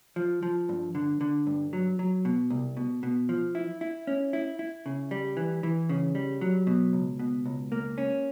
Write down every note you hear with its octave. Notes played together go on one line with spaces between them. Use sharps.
F3
F3
G2
D3
D3
G2
F#3
F#3
B2
C2
B2
B2
F3
E4
E4
C#4
E4
E4
C#3
G3
E3
E3
C#3
G3
F#3
B2
C#2
B2
C#2
A#3
C#4